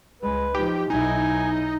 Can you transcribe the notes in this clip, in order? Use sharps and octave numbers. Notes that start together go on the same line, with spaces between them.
C#2 G#3 B4
F3 D#4 G4
B1 D#4 E4 G#5